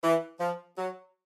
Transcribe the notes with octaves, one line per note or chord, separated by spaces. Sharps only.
E3
F3
F#3